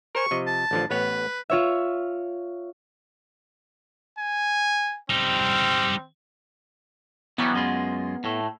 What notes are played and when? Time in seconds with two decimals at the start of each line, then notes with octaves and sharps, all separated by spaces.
0.15 A#4 C5 G#5 C#6
0.31 C3 F3 D#5
0.47 A5
0.71 A1 D3 F3
0.91 A1 B3 B4 C#5
1.50 F4 C#5 E5
4.19 G#5
5.10 G3 C4 D#4
7.38 E3 F#3 G3 B3
7.54 F#2 G#3 F4
8.24 A2 A3